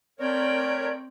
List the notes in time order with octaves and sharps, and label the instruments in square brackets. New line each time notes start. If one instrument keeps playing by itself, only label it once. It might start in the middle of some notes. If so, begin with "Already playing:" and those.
[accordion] A3 A#4 C#5 [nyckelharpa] C4 G5 [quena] D5